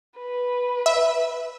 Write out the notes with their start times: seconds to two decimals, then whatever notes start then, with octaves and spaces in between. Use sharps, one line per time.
0.18 B4
0.86 E5